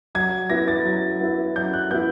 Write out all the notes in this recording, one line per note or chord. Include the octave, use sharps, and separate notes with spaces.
F#3 G#6
B3 E4 A#6
A6
F#3
B3 E4
F#3 G6
F#6
B3 E4 G6